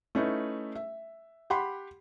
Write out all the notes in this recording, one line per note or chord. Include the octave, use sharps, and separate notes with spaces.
A3 C#4 D#4 E4 B4
E5
G4 F#5 B5 C6